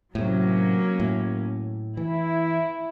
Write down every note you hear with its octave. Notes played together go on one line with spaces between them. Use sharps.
A2 C3 F#3 A#3 C#4
A2
E3 E4